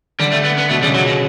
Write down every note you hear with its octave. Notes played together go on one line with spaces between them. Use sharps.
D3 G3
A3
B3
B3
B2 A3
C#3 G3
C#3 F#3
B2